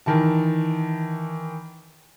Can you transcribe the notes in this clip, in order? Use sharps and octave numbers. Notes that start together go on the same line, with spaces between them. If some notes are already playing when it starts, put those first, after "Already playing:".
D#3 E3 A5